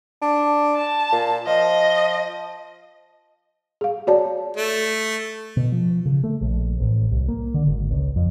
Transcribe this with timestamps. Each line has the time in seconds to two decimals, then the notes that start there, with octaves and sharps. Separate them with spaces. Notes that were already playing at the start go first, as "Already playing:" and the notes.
0.22 D4
0.75 A5
1.12 A#2
1.47 F3 D#5
3.81 G#4 F5
4.07 F#4 C#5 D5 A5
4.56 A3
5.57 B2
5.72 F3
6.06 C#3
6.24 A3
6.41 A#1
6.80 A1
7.11 C2
7.28 A#3
7.54 D3
7.67 G#1
7.91 C#2
8.16 F2